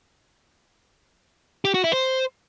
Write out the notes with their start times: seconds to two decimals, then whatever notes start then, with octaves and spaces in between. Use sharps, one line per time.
1.65 G4
1.74 F#4
1.84 E4
1.93 C5